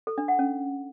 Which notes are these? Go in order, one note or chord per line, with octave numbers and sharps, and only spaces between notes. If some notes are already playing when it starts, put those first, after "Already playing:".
A4
D4
F#5
C#4